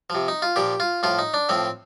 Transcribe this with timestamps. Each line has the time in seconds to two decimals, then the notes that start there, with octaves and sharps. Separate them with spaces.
0.10 C3 F3
0.28 D#4
0.42 F4
0.56 A#2 F3 G4
0.80 F4
1.03 A2 F3 F4
1.19 D#4
1.34 D4
1.49 A2 F3 C4